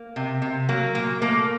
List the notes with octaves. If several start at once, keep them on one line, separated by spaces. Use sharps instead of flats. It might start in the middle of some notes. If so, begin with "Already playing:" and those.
Already playing: A#3
C3
C3
F#3 A#3
A#2 A#3
A3 A#3